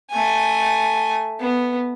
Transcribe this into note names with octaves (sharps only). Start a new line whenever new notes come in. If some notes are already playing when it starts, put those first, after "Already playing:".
A3 G#5
B3